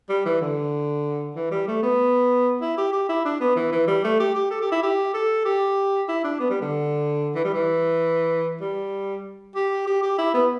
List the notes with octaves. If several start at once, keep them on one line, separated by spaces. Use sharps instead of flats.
G3
E3
D3
E3
G3
A3
B3
E4
G4
G4
E4
D4
B3
E3
E3
G3
A3
G4
G4
A4
G4
E4
G4
A4
G4
E4
D4
B3
G3
D3
E3
G3
E3
G3
G4
G4
G4
E4
B3